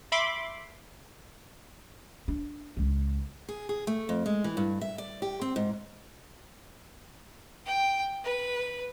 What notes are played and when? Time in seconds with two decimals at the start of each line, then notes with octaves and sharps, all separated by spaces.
0.12 E5 B5 C6 D6
2.28 D4
2.77 C#2 C#4
3.49 G#4
3.69 G#4
3.87 A3
4.09 F2
4.26 G#3
4.44 E3
4.57 G2
4.81 E5
4.98 D5
5.22 G4
5.41 C4
5.56 G#2
7.66 G5
8.23 B4